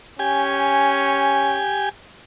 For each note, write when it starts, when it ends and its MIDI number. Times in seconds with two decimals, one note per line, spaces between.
0.19 1.61 61
0.19 1.89 67
0.19 1.89 80